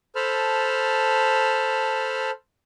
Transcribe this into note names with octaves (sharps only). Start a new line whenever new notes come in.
A4 C5 A5 B5 F6